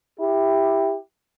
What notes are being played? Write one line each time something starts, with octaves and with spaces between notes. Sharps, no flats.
E4 G4